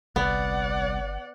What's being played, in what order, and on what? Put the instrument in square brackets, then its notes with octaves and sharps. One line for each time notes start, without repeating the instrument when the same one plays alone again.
[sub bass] G1 [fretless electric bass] C2 [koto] B3 [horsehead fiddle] D5 F#5